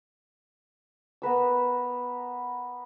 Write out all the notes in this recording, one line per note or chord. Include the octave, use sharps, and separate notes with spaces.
B3 A#4 B4 E6